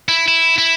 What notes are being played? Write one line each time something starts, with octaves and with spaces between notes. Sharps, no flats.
E4
E4
E4